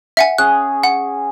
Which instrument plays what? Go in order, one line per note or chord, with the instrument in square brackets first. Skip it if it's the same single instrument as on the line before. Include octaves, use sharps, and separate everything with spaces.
[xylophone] E5 F#5 G#5
[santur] C#4 G#4 [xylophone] F#6
[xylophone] F#5